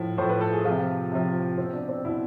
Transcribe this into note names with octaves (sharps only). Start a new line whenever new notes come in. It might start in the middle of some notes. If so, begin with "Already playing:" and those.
Already playing: A2 F3 E4
A2 F3 C5
B4
A4
G#4
C3 F3 F4
C3 F3
B2 C4
D4
C4
B2 E4